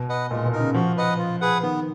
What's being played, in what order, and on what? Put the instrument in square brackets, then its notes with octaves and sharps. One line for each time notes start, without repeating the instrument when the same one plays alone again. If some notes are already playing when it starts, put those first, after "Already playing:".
Already playing: [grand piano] B2
[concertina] B4 D#5 F#5
[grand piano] A#2 [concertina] G#3
[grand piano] B2
[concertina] D#4 A#4
[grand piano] C#3
[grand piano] F3 [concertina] F#4
[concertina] B4 D#5 F#5
F4
G#4 B4 F#5
[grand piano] D#3 [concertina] B3